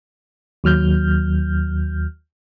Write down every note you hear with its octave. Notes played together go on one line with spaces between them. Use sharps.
D#2 F#3 F6 G6